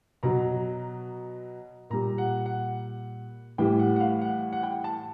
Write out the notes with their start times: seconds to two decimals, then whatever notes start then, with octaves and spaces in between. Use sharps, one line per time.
0.23 B2 F#3 A#5
1.90 A#2 G3 A#5
2.18 F#5
2.46 F#5
3.58 A2 E3 G3 G5
3.79 F#5
3.96 F#5
4.00 F5
4.21 F#5
4.53 F#5
4.63 G5
4.84 A5